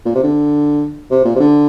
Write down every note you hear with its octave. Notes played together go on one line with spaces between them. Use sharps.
A#2
C3
D3
C3
A#2
C3
D3